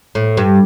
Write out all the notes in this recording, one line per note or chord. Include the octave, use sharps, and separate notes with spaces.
A2
G2